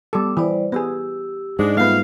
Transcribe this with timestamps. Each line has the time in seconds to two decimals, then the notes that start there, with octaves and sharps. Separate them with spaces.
0.13 G3 B3 A4 D6
0.37 E3 G3 C5 D5
0.72 B3 G4 G#4 E6
1.59 G#2 G#3 D4
1.77 G3 A3 B3 F4 E5 F5